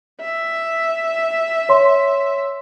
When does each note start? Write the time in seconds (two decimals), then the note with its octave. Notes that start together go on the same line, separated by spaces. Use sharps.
0.21 E5
1.69 C#5 C6